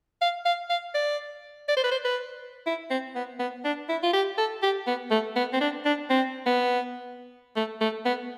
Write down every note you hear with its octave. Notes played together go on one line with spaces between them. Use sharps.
F5
F5
F5
D5
D5
C5
B4
C5
B4
E4
C4
B3
B3
D4
E4
F4
G4
A4
G4
B3
A3
B3
C4
D4
D4
C4
B3
A3
A3
B3